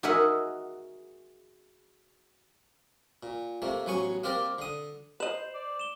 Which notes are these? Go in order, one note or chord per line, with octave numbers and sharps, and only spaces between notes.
F#4 G#4 A#4 D#5 E5 F#5
A#2
C3 A3 A#3
A1 F#3 B3 G#5 C#6
A#3 C4 G4 A#4 D5
D3 D#6
B4 C5 D#5 E7 F#7
D5
E7 G7